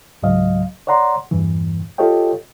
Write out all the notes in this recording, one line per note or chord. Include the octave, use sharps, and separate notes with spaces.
C#2 G#2 F#3 D#5 F5
C#5 D5 F#5 A#5 C6
E2 G2 A#2 E3
F4 G4 A4 C#5 D#5 G5